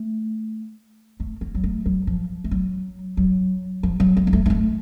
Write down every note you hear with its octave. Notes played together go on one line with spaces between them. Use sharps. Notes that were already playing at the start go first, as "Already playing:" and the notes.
Already playing: A3
A3
A#3
F#3
A3
F#3
F3
A3
F#3
F#3
F3
F#3
A3
A#3
A3
A#3
A3